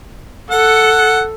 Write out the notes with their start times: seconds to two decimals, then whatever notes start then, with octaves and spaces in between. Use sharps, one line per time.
0.51 A4 F#5